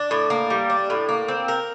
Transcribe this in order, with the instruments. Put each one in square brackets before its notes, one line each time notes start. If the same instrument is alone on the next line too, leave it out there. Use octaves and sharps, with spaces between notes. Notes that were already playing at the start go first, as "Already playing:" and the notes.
Already playing: [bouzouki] D4
A2
A#3
G3
D4
A2
A#3
C4
A#4